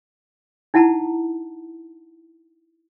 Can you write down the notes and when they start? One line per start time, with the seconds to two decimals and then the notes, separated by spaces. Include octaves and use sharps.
0.74 D#4 E4 F#5 A5 A#5